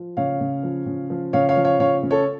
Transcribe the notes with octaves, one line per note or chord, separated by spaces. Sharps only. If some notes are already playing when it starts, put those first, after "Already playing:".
Already playing: F3
C#3 C#5 F5
C#3
F3
C#3
F3
C#3 C#5 F5
C#5 F5
F3
C#5 F5
C#3 C#5 F5
C#3
A4 C#5